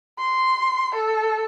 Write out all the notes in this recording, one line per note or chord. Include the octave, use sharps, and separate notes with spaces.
C6
A4